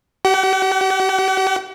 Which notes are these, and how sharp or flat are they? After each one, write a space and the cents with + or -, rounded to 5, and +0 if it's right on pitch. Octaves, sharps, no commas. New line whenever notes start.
G4 -35 F#5 +35